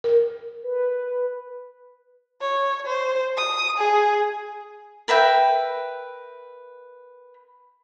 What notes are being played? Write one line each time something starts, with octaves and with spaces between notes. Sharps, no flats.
A#4
B4
C#5
C5
D#6
G#4
A#4 B4 E5 G5